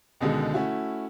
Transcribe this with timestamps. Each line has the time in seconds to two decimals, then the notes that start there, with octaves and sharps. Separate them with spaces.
0.20 C#2 B2 D3 D#3 G#3
0.54 A3 C#4 E4 F#4